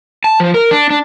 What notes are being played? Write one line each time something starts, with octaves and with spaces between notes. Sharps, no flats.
A5
F3
A#4
D4
D4